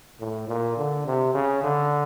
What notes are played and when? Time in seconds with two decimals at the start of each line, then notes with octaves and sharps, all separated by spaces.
0.20 A2
0.48 A#2
0.77 D3
1.06 C3
1.34 C#3
1.63 D3